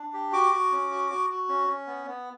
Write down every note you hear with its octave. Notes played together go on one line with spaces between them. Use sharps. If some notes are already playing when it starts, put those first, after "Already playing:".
Already playing: D4
G4
F#4 D6
F#4
C#4
F#4
F#4
F#4
C#4
C#4
B3
B3